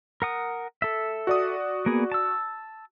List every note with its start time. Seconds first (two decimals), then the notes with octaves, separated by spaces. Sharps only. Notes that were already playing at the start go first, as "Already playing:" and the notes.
0.22 A#4 F#5 D#6
0.82 A4 E5
1.27 F#4 D5 D#6
1.86 A#3 B3 G#4
2.12 A5 E6